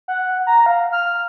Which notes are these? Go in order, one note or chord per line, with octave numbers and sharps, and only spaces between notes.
F#5
A#5
F5
F6